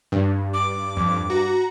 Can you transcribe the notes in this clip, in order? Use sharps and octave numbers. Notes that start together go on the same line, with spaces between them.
G2
D6
F2
F#4 A#5